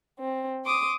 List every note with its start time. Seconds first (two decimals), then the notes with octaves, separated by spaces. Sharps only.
0.19 C4
0.64 C6 D6 D#6